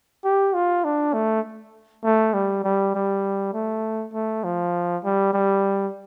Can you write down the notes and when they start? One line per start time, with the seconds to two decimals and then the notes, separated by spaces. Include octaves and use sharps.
0.25 G4
0.55 F4
0.84 D4
1.14 A3
2.04 A3
2.34 G3
2.64 G3
2.95 G3
3.53 A3
4.13 A3
4.44 F3
5.04 G3
5.33 G3